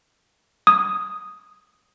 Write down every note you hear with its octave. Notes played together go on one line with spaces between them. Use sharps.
D#6